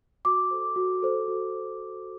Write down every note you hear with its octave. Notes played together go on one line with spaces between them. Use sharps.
F#4 D6
A4 C5
F#4
A4 C5
F#4